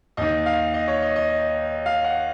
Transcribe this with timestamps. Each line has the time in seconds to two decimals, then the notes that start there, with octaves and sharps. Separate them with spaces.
0.17 D#2 D#3 D#5
0.46 F5
0.74 D#5
0.88 C#5
1.02 D#5
1.16 D#5
1.86 F5
2.04 F#5